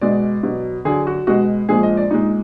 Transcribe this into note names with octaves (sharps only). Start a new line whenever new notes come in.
B2 G#3 D5
B2 F#3
D3 F#3 G#4
F#4
B2 G#3 F#4
A#2 F3 G#3 G#4
D#5
D5
A#2 G#3 D#4